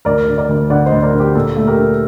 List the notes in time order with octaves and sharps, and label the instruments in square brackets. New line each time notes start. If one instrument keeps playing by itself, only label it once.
[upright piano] D2 A#4 D5
D3
A#4 D5
D2
D3 D5 F#5
C5 D#5
D2
A#4 D5
D3
G4
A#2 A4
A3
G4 A#4
D4